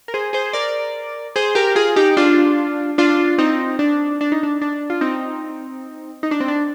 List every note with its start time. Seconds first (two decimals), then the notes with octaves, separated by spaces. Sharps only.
0.08 A#4
0.14 G#4 C5
0.33 G#4 C5
0.53 A#4 D5
1.36 G#4 C5
1.55 G4 A#4
1.75 F4 G#4
1.96 D#4 G4
2.17 D4 F4
2.98 D4 F4
3.38 C4 D#4
3.79 D4
4.21 D4
4.32 D#4
4.43 D4
4.61 D4
4.90 F4
5.01 C4 D#4
6.23 D#4
6.31 D4
6.40 C4
6.48 D4